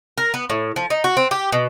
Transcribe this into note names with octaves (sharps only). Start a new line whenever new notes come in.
A#4
B3
A2
F3
D#4
F#4
C4
G4
B2